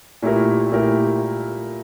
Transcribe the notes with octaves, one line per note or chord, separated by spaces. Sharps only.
A#2 A3 E4 G4 A#4
A#2 A3 E4 G4 A#4